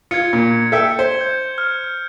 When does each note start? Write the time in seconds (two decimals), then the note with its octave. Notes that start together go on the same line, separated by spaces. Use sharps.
0.11 F4 G#6 C#7
0.33 A#2
0.72 A4 E5 G5
0.99 C5
1.21 G6
1.58 F6